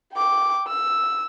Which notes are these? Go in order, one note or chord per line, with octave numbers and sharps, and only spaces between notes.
G5 D6
E6